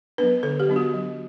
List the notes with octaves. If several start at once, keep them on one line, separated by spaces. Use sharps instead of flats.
F#3 B3 D4 B4
D3 A4
G4
F#3 B3 D4
F#4
F#3